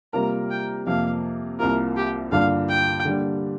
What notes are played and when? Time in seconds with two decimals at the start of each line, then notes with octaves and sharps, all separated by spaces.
0.13 C3 G3 A#3 F4 A#4 A#5
0.50 G5
0.87 F2 C3 F3 A#3 F5
1.59 C2 C3 A#3 F4 A#4
1.96 G4
2.32 G2 D3 A#3 D4 F4 F5
2.69 G5
3.05 D3 G3 A#3 D4